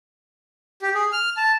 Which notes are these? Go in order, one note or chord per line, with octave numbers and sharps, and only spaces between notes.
G4
G#4
F6
A5